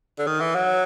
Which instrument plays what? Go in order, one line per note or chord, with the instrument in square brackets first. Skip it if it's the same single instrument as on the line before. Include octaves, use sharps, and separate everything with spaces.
[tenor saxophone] D3
D#3
E3
F#3